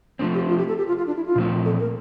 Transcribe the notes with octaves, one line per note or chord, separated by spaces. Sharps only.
F3 A3 C4 D4
G4
F4
G4
A4
G4
F4
F4
D4
E4
F4
A#2 F3 A3 C4
A4
A#4